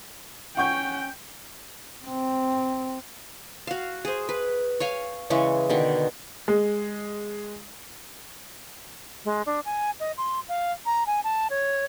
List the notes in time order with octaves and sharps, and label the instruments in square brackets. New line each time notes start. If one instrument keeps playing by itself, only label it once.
[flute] C#4 [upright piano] F#5 C#6 G6 [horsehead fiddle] G5
[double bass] C4
[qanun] F#4 F5
G#4 C5
B4
C#5 F5 G#5
C#3 E3 G#3 C#6
B2 D3 D#3
[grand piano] G#3
[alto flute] G#3
D4
G#5
D#5
C6
F5
A#5
G#5
A5
C#5